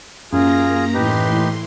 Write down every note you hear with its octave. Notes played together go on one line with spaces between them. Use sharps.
F#2 A#3 F4 G#4 A#5 A#6
A2 E3 D#4 G4 B4 C6